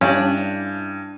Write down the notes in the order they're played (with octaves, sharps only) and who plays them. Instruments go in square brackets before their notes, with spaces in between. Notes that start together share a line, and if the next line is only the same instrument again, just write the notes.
[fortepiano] G2 [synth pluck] C#4 [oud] D4 D5 [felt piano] E4 F5 G#5